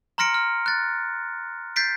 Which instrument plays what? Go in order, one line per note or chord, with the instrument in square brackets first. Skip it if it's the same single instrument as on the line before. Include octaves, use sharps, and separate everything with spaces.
[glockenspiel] A#5 C6 F6 A#6 C#7 D7
F6
F#6 A6
G6 A6 B6 C7 D7